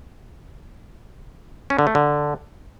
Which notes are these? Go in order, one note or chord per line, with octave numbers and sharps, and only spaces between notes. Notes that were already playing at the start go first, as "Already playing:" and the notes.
C#4
D3
A3
D3